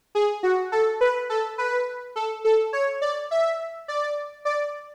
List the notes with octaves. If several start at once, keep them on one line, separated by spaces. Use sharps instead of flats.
G#4
F#4
A4
B4
A4
B4
A4
A4
C#5
D5
E5
D5
D5